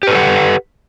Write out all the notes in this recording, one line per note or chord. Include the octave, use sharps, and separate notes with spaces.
G4 A4 B4 F#5